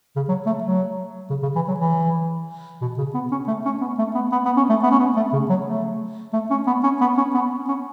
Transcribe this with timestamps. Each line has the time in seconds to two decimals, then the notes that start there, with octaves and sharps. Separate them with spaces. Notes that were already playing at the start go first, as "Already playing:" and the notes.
0.16 C#3
0.28 F#3
0.46 A3
0.63 F#3
1.29 C#3
1.42 C#3
1.55 E3
1.68 F#3
1.80 E3
2.81 B2
2.98 C#3
3.14 B3
3.31 C#4
3.47 A3
3.65 C#4
3.81 B3
3.98 A3
4.15 B3
4.32 B3
4.45 B3
4.57 C#4
4.69 A3
4.83 B3
4.91 C#4
4.99 B3
5.16 A3
5.32 C#3
5.49 F#3
5.66 A3
6.33 A3
6.50 C#4
6.67 B3
6.83 C#4
7.01 B3
7.17 C#4
7.34 B3
7.68 C#4